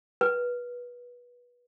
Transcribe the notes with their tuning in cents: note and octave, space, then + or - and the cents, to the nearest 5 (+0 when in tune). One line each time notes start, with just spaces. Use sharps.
B4 -20